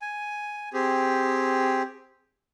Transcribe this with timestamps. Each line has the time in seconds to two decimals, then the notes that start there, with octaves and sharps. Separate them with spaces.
0.02 G#5
0.73 C4 G4 G#4